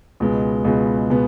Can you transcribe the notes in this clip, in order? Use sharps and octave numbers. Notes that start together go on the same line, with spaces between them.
C#2 B2 G#3 B3
C#2 B2 G#3 B3
B2 G#3 B3